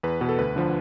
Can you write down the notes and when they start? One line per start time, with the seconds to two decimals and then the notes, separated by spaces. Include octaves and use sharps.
0.03 E2 B4
0.21 B2
0.29 A4
0.38 D2 B4
0.56 D3 F3